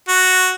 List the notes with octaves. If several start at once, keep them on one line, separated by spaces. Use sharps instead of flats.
F#4